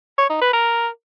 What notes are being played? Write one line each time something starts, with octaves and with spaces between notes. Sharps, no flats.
C#5
D#4
B4
A#4